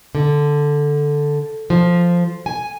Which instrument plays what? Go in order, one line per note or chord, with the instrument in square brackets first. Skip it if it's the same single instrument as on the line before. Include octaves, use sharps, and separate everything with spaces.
[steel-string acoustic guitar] D3
F3
G#5